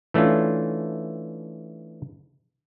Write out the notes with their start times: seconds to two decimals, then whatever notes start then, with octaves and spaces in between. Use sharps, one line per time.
0.14 E3 A3 C#4 D4 F4